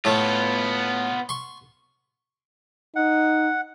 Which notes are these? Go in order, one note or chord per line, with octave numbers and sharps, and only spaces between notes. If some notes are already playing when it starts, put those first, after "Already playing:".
A2 A3 B3 F4
C6 C#6
D#4 F#5